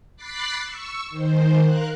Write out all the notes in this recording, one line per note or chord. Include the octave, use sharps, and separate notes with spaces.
B5 D6 F#6 A6 B6 C7
C#6 E6
D#3 C5
A#4 F5 F#6